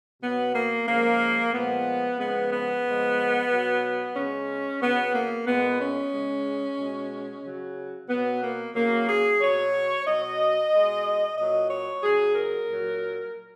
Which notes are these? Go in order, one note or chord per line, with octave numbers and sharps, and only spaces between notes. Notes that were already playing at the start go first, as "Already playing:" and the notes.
B2 F#3 B3
A#3
C#3 F3 G#3 A#3
A#2 F3 G#3 B3
C#3 F3 G#3 B3
B3
A#2 F3 G#3
B2 F#3
C#3 G#3 C#4
C#3 F#3 B3
A#3
A#2 G#3 B3
C#4
C#3 G#3
B2 G#3
C#3 F#3
B2 F#3 B3
A#3
C#3 F#3 A#3
G#4
B2 F#3 C#5
B2 F#3 D#5
B2 G#3
A#2 F#3 D#5
C#5
C#3 F#3 G#4
A#4
A#2 F#3